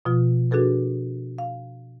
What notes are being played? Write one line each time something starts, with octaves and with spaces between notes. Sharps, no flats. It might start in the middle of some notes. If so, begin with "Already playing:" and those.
B2 F3 F4
D4 F#4 G#4 A4 B4
F5